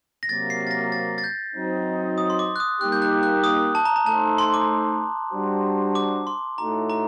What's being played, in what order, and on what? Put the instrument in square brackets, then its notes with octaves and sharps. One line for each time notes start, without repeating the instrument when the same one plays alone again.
[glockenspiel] A#6
[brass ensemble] C3 F#3 A#3 [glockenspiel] A6
[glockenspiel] C7
A6
A#6
A6
A6
G6
[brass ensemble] F#3 C4 D#4
[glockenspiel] D#6
C6
D6
F#6
D#6
[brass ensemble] G3 A#3 D#4 G4 [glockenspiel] F#6
[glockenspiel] G6
F#6
F#6
D#6
A5
A#5
A#5
[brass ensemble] A3 D#4 A4 C5 [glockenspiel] A5
[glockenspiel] C6
D6
[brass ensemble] G3 D4 F#4 C5
[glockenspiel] D6
C6
[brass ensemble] A2 A3 D#4 F#4 A4 [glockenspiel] A#5
[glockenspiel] A#5